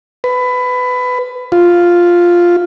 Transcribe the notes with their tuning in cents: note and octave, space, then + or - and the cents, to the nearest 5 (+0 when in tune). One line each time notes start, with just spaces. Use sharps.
B4 +20
F4 +0